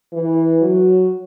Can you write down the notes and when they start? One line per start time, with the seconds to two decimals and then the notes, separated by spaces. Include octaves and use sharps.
0.13 E3
0.62 F#3